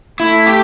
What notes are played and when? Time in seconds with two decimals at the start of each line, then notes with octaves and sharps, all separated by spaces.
0.20 A3 E4
0.47 G4